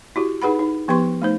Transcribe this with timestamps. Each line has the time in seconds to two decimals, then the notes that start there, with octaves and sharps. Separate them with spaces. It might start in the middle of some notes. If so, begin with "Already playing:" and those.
0.16 E4 F#4 G4
0.42 D#4 G#4 B4 F#5 B5
0.59 D#4
0.88 F3 B3 G4 B4 C6 C#6
1.22 A3 D#4 C5